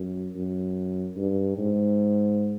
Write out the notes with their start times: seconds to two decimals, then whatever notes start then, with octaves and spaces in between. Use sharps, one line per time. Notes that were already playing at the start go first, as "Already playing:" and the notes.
Already playing: F#2
0.35 F#2
1.17 G2
1.58 G#2